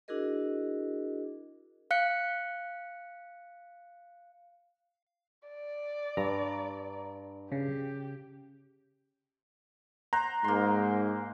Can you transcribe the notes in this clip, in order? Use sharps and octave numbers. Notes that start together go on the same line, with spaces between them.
D4 E4 F#4 G#4 A#4 D#5
F5 F#6 C#7
D5
G2 A#5
C#3 G4
C5 F#5 A#5
G#2 A#3 C6